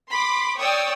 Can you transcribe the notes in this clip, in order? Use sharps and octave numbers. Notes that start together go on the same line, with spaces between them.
B5 C6 D6
C#5 D5 G5 C#6 D#6 E6